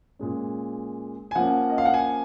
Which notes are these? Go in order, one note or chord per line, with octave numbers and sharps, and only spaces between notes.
A#2 G#3 C#4
G#5
F3 A#3 C#4 F#5
D#5
F5
F#5
G#5